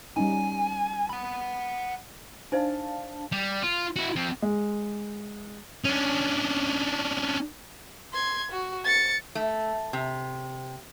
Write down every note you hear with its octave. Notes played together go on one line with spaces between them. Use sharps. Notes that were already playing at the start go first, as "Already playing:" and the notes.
G3 C#4 D#4 G#5
F#5 B5
D4 D#4 C5 F5 G#5 A5
G3
F4
E4 F#4
F3 C4
G#3
C#4 D4
C6 G#6
F#4
A6 C#7
A3
C3